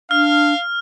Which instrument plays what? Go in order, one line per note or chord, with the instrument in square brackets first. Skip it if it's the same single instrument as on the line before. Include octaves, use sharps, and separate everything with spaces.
[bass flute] D4 [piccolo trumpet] F5 [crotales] F6